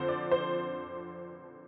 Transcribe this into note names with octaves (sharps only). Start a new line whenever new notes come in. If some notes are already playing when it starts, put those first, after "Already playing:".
Already playing: F2 D3 F3 C4 C5
D5
C5